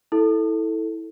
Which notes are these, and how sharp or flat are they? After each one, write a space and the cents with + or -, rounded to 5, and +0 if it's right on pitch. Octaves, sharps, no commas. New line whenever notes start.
E4 -20 A4 +0